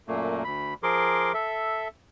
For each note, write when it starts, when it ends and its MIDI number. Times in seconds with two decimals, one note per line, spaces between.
0.08 0.43 42
0.08 0.43 46
0.08 0.43 57
0.08 0.43 58
0.44 0.74 38
0.44 0.74 83
0.83 1.32 53
0.83 1.32 68
0.83 1.32 70
0.83 1.32 84
0.83 1.32 86
1.34 1.88 69
1.34 1.88 76